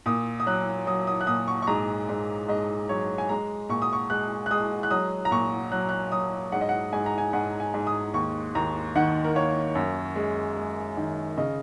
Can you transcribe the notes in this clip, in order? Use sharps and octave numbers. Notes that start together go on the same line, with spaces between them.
A#2 D#6
D#6
F#3 F#6
F#3 D#6
D#6
F#6
A#2 D#6
C#6
C#6
G#2 A#5
G#2
G#2 D#5
F#3 C#5
G#5
G#3 A#5
A#2 C#6
D#6
C#6
G#3 F#6
F#6
G#3 D#6
F#6
F#3 D#6
A#5
A#2 C#6
F#3 F#6
F#6
F#3 D#6
G#2 F#5
D#5
F#5
G#2 G#5
A#5
G#5
G#2 F#5
G#5
G#2
D#6
D#2 C#6
D#2 A#5
D#3 F#5
A#4
A#3 C#5
F#2
G#3
G#3
D#3
C#3 D#5